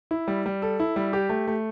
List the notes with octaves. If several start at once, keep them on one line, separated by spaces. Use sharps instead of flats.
E4
G3
G3
A4
E4
G3
G4
A3
A3